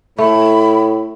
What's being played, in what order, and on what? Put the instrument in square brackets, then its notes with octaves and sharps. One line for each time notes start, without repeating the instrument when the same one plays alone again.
[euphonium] A2 [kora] A3 [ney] B5